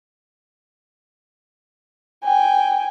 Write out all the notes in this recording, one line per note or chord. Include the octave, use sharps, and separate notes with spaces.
G5 G#5